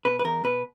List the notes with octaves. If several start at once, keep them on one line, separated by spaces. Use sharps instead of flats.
B2 B4
B4
E2 A#4
B2 B4